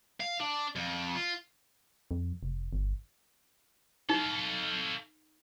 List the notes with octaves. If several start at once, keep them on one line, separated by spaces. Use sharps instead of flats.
F5
D4
F2
F4
F2
F1
G1
D#4 A4 F5